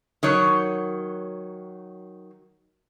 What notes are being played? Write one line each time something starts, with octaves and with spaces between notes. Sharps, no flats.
D#3 F#3 C#5